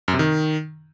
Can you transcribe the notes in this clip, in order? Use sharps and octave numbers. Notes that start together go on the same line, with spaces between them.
F#2
C3
D#3